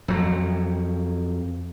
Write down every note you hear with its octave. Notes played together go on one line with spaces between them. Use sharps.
F2 F#3